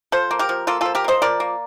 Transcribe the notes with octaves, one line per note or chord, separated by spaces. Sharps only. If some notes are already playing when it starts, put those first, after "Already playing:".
F3 A4 C5
A#3
G4 A#4
F3
A#3 F4 A4
F3 F4 A4
G4 A#4
A#3 C5 D#5
F3 A#4 D5
A#3